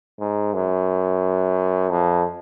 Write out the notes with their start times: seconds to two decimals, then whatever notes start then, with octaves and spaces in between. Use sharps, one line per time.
0.20 G#2
0.54 F#2
1.90 F2